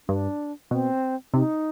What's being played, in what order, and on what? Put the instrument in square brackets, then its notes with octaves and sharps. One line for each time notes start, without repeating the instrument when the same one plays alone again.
[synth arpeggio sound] G2 [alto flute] D4
[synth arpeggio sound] B2 [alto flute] C4
[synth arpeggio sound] C3 [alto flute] D#4